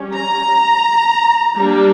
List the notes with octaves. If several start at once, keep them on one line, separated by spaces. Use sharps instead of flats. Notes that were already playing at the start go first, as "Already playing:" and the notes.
Already playing: G3 C#4
A#5
G3 A#3 D4